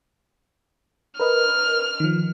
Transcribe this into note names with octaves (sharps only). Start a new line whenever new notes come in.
A#4 B4 D#5 F6
D#3 F3